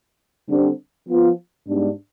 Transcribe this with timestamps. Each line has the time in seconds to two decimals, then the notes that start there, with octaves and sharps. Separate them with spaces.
0.48 D3 G3 C4
1.08 F3 B3 F4
1.68 G#2 G3 B3 D4